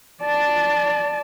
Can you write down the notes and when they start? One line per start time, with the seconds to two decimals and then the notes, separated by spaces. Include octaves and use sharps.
0.22 D5 A5